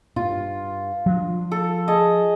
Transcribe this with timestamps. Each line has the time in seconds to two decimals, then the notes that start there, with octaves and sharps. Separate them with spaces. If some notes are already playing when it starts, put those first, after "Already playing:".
0.16 G2 F4
1.06 F3 D4
1.51 A4
1.88 G#4 D#5 A5